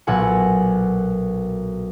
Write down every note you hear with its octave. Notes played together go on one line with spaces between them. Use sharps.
B1 A#2 A4 F#5 G#5